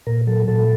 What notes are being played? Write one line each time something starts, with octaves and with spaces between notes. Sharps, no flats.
A#2 A#4
F#3 A4
A#2 A4